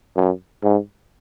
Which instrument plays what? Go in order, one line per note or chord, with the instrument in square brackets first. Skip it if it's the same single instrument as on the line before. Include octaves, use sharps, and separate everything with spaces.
[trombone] F#2
G#2